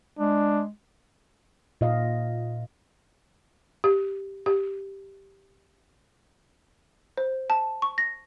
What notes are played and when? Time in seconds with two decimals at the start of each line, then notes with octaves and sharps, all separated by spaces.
0.19 G#3 D4
1.81 A#2 D#5 F5
3.84 G4
4.46 G4
7.17 C5
7.50 A5
7.82 C#6
7.98 A#6